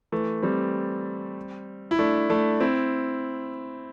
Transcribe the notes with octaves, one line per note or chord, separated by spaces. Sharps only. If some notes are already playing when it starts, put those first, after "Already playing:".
E3 A3
G3 C4
E4
A3 D4
A3 D4
C4 E4